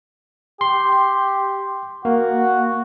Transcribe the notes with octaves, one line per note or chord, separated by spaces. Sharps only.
G4 C6
A#3 F#4